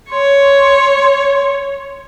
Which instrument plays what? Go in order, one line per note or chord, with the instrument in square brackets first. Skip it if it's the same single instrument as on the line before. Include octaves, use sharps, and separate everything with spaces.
[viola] C#5 [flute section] C6